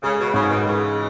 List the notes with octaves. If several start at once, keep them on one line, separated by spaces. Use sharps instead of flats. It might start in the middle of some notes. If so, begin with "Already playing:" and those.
C#3 G#3
B2
G#2 C#3
B2 D#3
C#3 E3 G#3